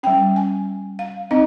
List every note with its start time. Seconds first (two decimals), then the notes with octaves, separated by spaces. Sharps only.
0.03 G3 C#4 G5
0.36 G#5
0.99 F5
1.31 C4 D#4 D#5